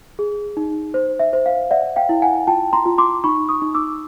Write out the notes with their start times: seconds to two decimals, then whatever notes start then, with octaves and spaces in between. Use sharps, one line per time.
0.19 G#4
0.57 D#4
0.94 C5
1.20 E5
1.33 C5
1.46 F5
1.71 D5 E5 F#5
1.96 F5 G5
2.09 E4
2.22 F#5 G#5
2.47 F4 G5 A5
2.73 A#5 C6
2.86 F4
2.98 C6 D6
3.24 D#4 B5 C#6
3.49 C#6 D#6
3.62 D#4
3.74 D6 E6